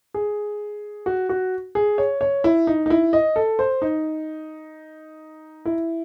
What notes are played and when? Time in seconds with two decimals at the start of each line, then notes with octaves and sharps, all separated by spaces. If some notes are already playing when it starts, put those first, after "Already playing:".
0.14 G#4
1.06 F#4
1.29 F#4
1.75 G#4
1.98 C#5
2.21 C#5
2.44 E4
2.67 D#4
2.86 D#4
2.90 E4
3.13 D#5
3.36 A4
3.59 C5
3.82 D#4
5.65 E4